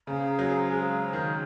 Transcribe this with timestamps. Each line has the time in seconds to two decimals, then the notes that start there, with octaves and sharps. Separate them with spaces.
0.07 C#3 G#4 C5 F5 A#5
0.39 F#3
0.70 G#3 G#4 C5 F5 A#5
1.13 D#3